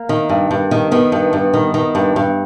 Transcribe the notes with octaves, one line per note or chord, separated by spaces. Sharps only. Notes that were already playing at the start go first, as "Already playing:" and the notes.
Already playing: A#3
D#3
G2
G2
D#3
D#3 B3
G2
G2
D#3
D#3
G2
G2